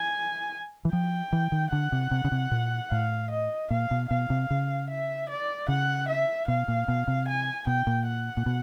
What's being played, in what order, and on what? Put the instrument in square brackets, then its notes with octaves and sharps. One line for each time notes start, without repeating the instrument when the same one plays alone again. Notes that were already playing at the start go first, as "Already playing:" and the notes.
Already playing: [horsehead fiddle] G#5
[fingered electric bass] E3
[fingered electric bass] F3 [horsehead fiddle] G5
[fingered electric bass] E3
D#3
[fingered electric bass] D3 [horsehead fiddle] F#5
[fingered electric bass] C3
C3
C#3
C3
A#2
[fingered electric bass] A2 [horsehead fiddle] F5
[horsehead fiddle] D#5
[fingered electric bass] A#2 [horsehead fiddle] F5
[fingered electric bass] B2
[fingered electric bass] B2 [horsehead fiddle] F5
[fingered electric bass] C3
C#3
[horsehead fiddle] E5
D5
[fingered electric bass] C#3 [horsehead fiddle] F#5
[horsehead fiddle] E5
[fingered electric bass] B2 [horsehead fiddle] F5
[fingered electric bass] A#2
B2
C3
[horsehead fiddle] G#5
[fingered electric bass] B2 [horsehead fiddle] G5
[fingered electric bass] A#2
[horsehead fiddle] F#5
[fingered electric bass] A#2
B2